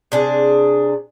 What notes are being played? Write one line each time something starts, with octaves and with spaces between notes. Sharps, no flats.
C3 D4 G#4